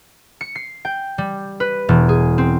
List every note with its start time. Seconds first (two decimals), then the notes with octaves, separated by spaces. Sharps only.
0.41 C#7
0.55 C7
0.85 G5
1.18 G3
1.60 B4
1.88 E1
2.09 G#4
2.38 C4